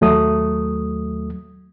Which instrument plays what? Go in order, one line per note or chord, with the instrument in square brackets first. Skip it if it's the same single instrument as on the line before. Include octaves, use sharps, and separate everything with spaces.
[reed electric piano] D#2 F#3 A3 D#6